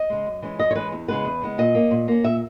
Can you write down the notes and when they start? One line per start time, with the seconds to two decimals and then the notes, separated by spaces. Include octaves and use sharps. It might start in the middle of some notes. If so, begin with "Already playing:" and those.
Already playing: D#5
0.10 C#3 G#3
0.26 F#2
0.42 E3 G#3 C#4
0.59 F#2 D#5
0.71 C#5
0.75 E3 G#3 C#4 B4
0.92 E2
1.08 C#3 G#3 B3 B4
1.25 E2
1.42 C#3 G#3 B3
1.58 A#2 D#5
1.75 A#3 C#4
1.91 A#2
2.08 A#3 C#4
2.24 A#2 E5